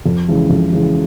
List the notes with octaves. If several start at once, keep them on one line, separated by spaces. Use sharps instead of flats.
F2
C#3 E3 G#3
F2
C#3 E3 G#3